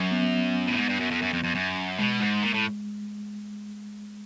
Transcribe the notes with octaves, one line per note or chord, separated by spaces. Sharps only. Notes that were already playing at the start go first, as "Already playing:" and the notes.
Already playing: F#2 F#3
B3
B3
A2
G#2
G2
F#2
F2
F#2
F2
F2
F#2
B2 G#3
G#2
A#2
A2